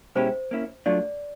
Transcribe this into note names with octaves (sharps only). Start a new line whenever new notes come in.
B2 G#3 C#4 E4 G4 C5
A#3 C#4 E4
F#3 A3 D4 F4 D5